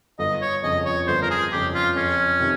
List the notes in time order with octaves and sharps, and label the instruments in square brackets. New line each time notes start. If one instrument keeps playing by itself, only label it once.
[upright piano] G1 [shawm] D#5
[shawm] C#5
[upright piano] F2 C#3 [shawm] D#5
[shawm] C#5
[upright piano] G1 [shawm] C5
[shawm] A#4
G#4
[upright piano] F2 C#3 [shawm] G4
[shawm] F4
[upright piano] F2 [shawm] C#4
[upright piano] C3 D#3